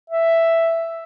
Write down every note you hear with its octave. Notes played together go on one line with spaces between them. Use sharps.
E5